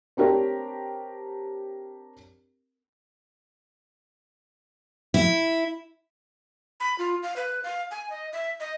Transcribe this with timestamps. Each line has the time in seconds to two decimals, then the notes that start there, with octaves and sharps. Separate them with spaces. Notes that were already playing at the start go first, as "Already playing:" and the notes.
0.17 C4 D4 G4 A#4 C#5
5.14 E4
6.80 B5
6.99 F4
7.23 F5
7.36 B4
7.64 F5
7.91 G#5
8.10 D#5
8.33 E5
8.60 D#5